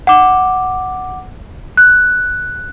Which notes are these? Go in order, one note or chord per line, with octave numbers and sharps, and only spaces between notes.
F#5 D6
F#6